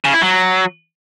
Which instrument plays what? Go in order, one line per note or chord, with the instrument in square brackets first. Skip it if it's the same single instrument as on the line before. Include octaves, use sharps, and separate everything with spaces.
[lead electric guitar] C#3
E4
F#3